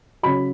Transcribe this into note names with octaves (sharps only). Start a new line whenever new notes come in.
C#3 F#3 B5